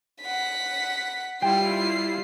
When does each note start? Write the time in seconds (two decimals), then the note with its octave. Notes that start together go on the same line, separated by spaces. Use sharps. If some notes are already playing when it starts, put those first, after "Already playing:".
0.22 F#5 B6
1.42 G3 E4 F4 G5 C7